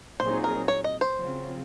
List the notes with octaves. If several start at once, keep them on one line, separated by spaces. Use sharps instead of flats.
A#2 F#3 C4 D#4 G#4 C5
A#4
C#5
D#5
C5
C#3 F#3 C4 F4